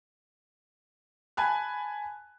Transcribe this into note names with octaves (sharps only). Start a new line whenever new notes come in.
G#5 A5 B5 F#6